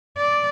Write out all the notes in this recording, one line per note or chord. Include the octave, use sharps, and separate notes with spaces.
D5